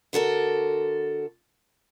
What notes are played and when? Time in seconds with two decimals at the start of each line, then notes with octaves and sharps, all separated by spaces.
0.13 D3 F#4 A4 A#4